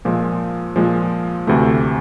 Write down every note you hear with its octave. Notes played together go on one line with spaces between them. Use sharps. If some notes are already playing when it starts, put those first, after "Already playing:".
A#2 F3 G#3
A#2 F3 G#3
D2 C3 E3 A3